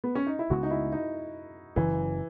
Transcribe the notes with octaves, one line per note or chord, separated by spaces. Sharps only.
B3
C#4
D#4
E4
C#2 C#3 G#3 B3 F#4
D#4
E4
D#4
F#1 F#2 C#3 E3 F#3